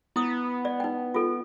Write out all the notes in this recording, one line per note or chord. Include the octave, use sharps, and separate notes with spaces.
B3 E4 D#6
D5
D#4 G5
F4 A4